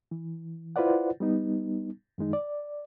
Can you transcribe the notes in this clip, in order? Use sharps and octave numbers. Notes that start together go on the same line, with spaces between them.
E3
E4 F4 B4 C5 D5 F#5
G3 B3 D#4
F#2 D#3 G#3 D#4
D5